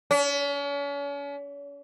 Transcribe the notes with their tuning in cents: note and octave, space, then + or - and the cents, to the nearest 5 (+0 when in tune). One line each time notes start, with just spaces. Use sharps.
C#4 +40